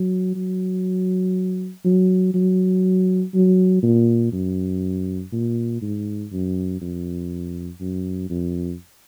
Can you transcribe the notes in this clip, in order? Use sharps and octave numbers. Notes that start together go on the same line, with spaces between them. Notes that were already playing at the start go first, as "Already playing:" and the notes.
Already playing: F#3
F#3
F#3
F#3
F#3
A#2
F#2
A#2
G#2
F#2
F2
F#2
F2